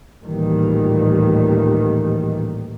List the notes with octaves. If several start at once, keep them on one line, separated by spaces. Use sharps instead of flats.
A1 D2 A#2 D#3 E3 G3